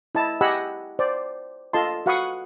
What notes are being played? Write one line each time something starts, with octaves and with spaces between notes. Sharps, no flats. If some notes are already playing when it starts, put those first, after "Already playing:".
E4 D#5 A5
G4 D#5 F#5 G#5 B5 E6
C5 D5
F4 A4 D#5 A5 C6
F#4 F5 F#5 B5 C#6 D#6